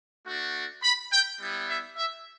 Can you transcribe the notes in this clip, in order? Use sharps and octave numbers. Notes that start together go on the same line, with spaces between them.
A3 D4 F#4
B5
G5
G3 B3 E4
E5
E5